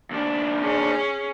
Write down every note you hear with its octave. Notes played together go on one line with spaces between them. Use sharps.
D#2 D4
C#4 G#4